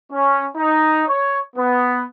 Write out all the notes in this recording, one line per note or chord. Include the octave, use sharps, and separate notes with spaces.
C#4
D#4
C#5
B3